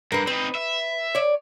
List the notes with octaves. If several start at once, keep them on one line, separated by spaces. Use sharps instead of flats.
G2 A#4 B4
C4 D#4 B4
E5
C#5 D5